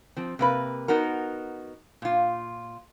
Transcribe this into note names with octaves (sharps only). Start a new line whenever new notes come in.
F3 C4
C3 A#3 B4
B3 D#4 F#4 A#4
A#2 F4